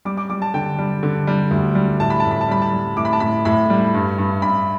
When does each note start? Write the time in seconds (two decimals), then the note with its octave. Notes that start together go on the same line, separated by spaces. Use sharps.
0.05 G3 D6
0.17 D6
0.30 G3 D6
0.42 A5
0.54 D3 G5
0.78 G3
1.03 D3
1.27 G3
1.51 D2
1.75 G3
2.00 A2 A5
2.10 B5
2.20 A2 A5
2.31 B5
2.41 A5
2.49 G3 B5
2.62 A5
2.73 G3
2.97 A2 D6
3.05 B5
3.13 A5
3.20 A2 B5
3.45 A2 B5
3.70 G3
3.94 G2
4.18 G2
4.42 G2 B5